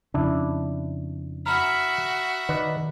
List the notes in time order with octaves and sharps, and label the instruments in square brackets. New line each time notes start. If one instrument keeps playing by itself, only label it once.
[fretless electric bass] F2 C#3 [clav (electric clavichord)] D4 E4
[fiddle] F#4 E5 [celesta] A#5 B5 F6
[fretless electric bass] D#3 [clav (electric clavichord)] B4 D5 D#5